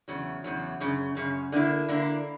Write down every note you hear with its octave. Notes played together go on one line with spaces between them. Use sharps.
E2 C#3 F#3
E2 C#3 F#3
F#2 C#3
F#2 C#3
D3 A#3 E4
D3 A#3 E4